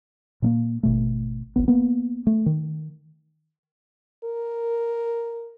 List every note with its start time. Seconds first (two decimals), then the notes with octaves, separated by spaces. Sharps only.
0.42 A#2 A3 A#3
0.83 G#1 B2 A3
1.56 D1 G#1 B3
1.68 A#3 B3
2.27 A3
2.46 D#3
4.24 A#4